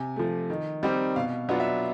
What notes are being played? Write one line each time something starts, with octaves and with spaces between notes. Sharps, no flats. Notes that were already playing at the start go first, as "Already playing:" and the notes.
Already playing: C3 G#5
F3 A3
D#3
G3 C4 D#4
B2 F5
F#3 B3 D4 F4
E5